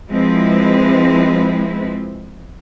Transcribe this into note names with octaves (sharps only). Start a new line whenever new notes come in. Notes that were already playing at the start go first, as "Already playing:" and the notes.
F3 G#3 C4 E4 B4